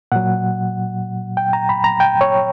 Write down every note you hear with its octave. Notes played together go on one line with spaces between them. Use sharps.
A#2 F#3 F#5
G5
A#5
B5
A#5
G5
C#5